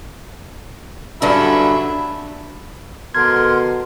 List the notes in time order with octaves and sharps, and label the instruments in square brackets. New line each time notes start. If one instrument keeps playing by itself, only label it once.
[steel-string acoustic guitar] G2 D3 C#4 [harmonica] F#3 E5 B5
[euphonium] B2 [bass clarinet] D3 [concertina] A#4 C6 [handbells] G#6